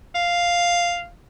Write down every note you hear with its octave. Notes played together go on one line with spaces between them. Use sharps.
F5